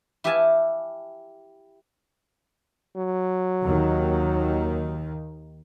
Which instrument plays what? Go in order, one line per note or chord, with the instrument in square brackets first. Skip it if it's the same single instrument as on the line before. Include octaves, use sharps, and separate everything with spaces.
[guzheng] E4 G4 E5 F5 G#5 A5
[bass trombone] F#3
[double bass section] D#2 D#3